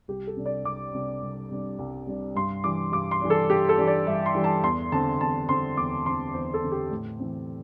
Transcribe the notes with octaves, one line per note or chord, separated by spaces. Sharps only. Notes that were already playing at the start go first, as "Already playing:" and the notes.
C2 G4
A4
C3 G3 D4
D5
C2 D6
C3 G3 D4
C2
C3 G3 D4
C2
C3 G3 D4
G2 C6
E3 G3 D4 D6
G2 D6
C6
E3 G3 D4
A4
G2 G4
A4
E3 G3 D4
D5
G2 E5
C6
E3 G3 D4
A5
E2 C6
D3 C4 A5
E2 A5
D3 C4 C6
E2 D6
D3 C4 C6
E2 C5
A4
D3 C4
G4
A2
E3 C4